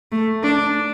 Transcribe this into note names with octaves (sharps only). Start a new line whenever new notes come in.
A3
D4